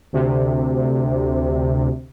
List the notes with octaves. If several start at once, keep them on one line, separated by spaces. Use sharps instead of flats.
D2 C3